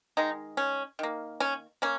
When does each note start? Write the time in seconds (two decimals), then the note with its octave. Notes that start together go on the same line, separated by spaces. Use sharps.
0.17 D#3 G#3 D#4
0.57 C#4
0.99 D#3 A#3
1.40 C#4
1.82 A#3 C#4